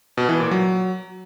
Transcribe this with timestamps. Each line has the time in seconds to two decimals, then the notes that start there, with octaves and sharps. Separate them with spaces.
0.17 B2
0.29 E3
0.40 A#2
0.51 F#3